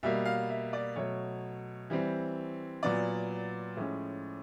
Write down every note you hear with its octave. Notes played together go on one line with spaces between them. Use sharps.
B2 G3 A#3 E5
F5
E5
D5
B2 F#3 A3 C#5
E3 G3 C4
A#2 F#3 B3 D5
A2 F3 G#3 C#4